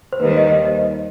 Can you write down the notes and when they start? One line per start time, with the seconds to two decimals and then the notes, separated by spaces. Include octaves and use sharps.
0.13 C5
0.19 D#2 D#3 G3 B4
0.37 D#5
0.47 C5
0.66 D#5